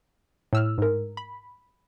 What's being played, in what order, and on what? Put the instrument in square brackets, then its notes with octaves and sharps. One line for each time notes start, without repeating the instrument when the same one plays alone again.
[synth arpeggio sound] A2 E6 F6
G#2 A#4
B5